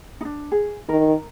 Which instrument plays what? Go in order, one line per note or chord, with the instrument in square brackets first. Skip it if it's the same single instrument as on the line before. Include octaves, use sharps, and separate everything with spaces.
[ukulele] D4 D#4
G#4
[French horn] D#3 [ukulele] A#4